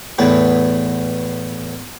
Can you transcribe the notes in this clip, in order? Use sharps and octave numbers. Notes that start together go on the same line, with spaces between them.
E2 A2 B3